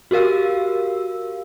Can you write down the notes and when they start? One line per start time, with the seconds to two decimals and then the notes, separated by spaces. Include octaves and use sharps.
0.11 F#4 G4 A#4 F5 E6